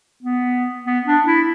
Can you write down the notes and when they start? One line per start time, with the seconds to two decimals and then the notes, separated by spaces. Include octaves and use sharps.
0.23 B3
0.85 B3
1.06 D4
1.27 E4